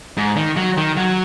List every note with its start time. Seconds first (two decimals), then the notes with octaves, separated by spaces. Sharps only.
0.17 G#2
0.37 D#3
0.57 F#3
0.77 D#3
0.97 F#3